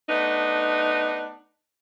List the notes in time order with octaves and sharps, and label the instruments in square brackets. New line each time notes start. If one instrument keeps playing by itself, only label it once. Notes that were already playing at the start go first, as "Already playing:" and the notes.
[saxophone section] A3 B3 D4 D#4